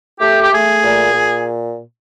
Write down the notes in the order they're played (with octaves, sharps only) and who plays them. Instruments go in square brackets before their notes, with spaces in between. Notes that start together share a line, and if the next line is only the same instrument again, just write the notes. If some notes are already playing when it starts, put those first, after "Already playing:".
[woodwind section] A3 G4
G4
A3 G#4
A#2
A#2